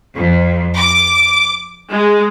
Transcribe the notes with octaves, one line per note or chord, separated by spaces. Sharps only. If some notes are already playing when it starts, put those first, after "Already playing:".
F2
D6
G#3